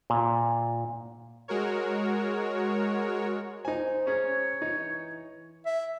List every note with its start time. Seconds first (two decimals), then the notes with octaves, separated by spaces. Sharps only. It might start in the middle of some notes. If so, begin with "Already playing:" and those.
0.10 A#2
1.48 G#3 F#4 A#4 C#5
3.65 D#4 C5 G#5
4.07 C#4 G#4 C#5 A#5
4.62 E3 D#4
5.66 E5